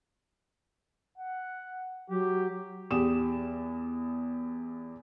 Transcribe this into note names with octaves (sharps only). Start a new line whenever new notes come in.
F#5
F#3 G4
E2 G4 D#6 E7